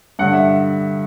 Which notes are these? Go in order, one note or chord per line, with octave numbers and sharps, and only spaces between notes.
G2 D3 F#5
E5